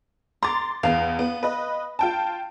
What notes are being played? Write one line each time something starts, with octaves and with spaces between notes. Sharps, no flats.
A#5 C6 D6 A6
E2 B3 F5
B3
B4 D#5
F4 G5 A5